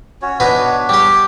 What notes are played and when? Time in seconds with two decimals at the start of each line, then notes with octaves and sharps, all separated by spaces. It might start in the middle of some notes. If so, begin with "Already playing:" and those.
0.22 C#4 F#4 C#5
0.40 B2 B3 D4 D#4 B4 C#5
0.89 G3 G4 D6